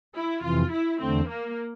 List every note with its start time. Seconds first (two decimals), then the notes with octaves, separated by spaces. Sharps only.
0.15 E4
0.43 F2 C3 E3 F4
0.72 E4
1.00 E2 D3 A3 C4
1.29 A#3